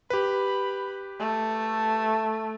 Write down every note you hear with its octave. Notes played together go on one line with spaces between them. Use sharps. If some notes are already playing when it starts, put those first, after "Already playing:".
G4 B4 B5
A3